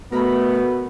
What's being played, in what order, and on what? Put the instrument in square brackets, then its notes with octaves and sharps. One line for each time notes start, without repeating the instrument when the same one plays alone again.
[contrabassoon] B2 [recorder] A3 [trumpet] B3 [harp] A#4 B5